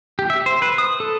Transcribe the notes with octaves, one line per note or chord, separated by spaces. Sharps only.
G4
E5
C5
B4
D#6
A4